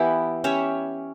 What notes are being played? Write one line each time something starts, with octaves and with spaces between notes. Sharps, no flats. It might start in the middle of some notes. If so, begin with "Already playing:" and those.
Already playing: E3 B3 E4 G4
C#4 G4 C#5 E5